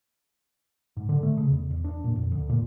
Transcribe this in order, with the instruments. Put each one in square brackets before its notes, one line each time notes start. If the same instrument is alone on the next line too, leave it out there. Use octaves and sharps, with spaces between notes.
[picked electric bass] G#2
D3
A3
C#3
E2
E2
D4
A#2
F2
D2
A#2